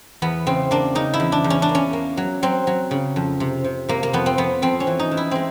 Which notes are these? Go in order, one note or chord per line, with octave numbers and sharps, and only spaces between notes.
E2 B3
C#3 C4
A#3 D4
C#3 D#4
E4
E2
D4
E2
C#4
D4
A#3
C#4
A#3
F#3
F#3 C4
F#3
C#3
F2
C3
C3
C3 A#3
A#3
F2 B3
C4
F2 B3
F2 C4
C#4
E3
D#4
E3
E4
G#3 C4